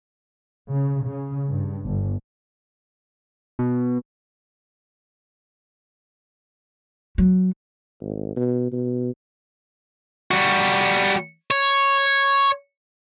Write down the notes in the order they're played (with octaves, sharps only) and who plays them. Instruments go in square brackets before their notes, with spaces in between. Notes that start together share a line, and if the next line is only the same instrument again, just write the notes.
[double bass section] C#3
C#3
G2
G1
[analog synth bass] B2
[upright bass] F#3
[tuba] G#1
B2
B2
[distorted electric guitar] G3 F#4
C#5